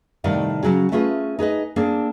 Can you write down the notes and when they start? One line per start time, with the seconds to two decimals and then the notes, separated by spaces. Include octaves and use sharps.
0.24 A2 C3 D#3 G3 D5 F5
0.63 C#3 F#3 G#4
0.92 A3 C#4 F4 G#4 B4
1.39 D#4 G#4 B4 D#5
1.76 A#3 C4 D4 G#4